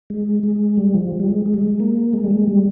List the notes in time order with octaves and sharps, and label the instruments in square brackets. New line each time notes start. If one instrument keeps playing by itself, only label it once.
[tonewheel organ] G#3
G#3
G3
F3
G3
G#3
G#3
G3
G#3
A#3
G#3
G3
G#3
G3